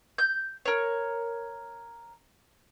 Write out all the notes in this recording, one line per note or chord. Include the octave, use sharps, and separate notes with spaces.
G6
A#4 C#5